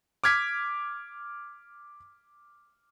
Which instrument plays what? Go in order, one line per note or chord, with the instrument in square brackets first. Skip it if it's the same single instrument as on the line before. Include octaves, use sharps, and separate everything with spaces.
[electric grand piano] D6 F6 G#6 B6